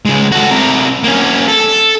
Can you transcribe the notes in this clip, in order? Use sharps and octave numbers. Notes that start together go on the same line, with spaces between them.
C#2 G#3
F#4 A4
C3 A#4
A#3 C#4
A4